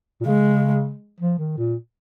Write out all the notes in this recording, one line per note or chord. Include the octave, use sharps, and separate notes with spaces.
A#2
C#3 G#3
F3
D#3
A#2